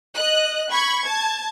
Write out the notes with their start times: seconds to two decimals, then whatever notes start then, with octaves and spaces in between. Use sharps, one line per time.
0.15 D#5 F#6
0.70 B5 C#6 G#6
1.03 A5 G#6